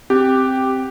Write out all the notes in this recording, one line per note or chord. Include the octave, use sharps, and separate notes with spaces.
C4 G4 G5